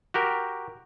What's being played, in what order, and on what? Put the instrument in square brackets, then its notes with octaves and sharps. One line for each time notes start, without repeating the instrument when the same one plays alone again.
[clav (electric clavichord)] F#4 G4 A#4